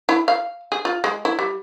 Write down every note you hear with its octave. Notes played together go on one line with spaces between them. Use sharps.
E4
F5
G#4
F4
G#3
E4
G3